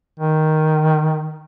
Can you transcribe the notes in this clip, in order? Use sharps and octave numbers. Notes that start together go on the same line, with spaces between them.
D#3